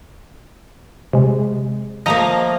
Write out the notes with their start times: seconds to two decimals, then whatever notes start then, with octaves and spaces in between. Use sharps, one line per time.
1.13 C3 G#3
2.06 F3 A3 A#3 D#5 A#5